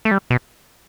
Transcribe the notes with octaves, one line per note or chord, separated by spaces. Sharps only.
A3
G3
B2